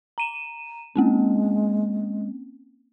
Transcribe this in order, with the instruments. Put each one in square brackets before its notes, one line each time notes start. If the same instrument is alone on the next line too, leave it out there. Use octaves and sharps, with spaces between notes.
[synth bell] A#5 D#7 E7
[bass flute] G#3 [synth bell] A#3 C4 C#4